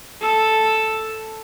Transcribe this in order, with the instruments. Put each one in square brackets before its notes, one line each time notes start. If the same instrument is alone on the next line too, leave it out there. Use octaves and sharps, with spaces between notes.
[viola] A4